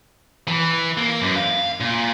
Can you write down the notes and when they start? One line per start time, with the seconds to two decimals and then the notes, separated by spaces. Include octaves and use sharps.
0.48 E3
0.98 A#3
1.22 F#2
1.36 F5
1.80 A#2